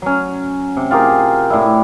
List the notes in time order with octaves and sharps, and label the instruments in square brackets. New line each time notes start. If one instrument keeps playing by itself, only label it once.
[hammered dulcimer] F#3 C#4
C3
F4 G4 G#4 A#4
A2 D4 E4